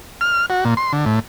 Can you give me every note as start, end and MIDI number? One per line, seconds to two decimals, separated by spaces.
0.21 0.46 89
0.50 0.64 66
0.65 0.74 46
0.77 0.92 84
0.93 1.05 50
1.06 1.20 45